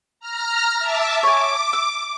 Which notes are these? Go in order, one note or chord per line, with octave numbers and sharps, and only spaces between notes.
A#5 F6
E5 A5 D6
C#5 G#5 D6
E6